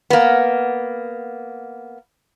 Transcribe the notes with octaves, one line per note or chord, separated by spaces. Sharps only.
A#3 B3